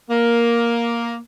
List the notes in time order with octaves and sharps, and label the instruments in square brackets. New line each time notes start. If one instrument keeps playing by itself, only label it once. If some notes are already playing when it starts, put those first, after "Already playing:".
[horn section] A#3